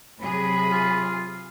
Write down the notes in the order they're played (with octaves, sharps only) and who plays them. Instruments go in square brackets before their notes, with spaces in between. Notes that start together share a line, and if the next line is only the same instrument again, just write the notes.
[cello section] C3 F#3 G#4 [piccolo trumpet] B5
[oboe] F4